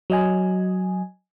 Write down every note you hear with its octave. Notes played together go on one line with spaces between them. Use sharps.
F#3 D#5 G#5